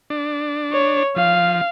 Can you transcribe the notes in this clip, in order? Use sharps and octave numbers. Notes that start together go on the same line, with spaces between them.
D4
C#5
F3 F5